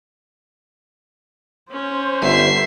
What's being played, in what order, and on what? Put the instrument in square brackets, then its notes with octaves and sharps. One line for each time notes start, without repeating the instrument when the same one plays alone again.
[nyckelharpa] C#4 [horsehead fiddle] C5
[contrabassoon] G1 [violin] E5 C7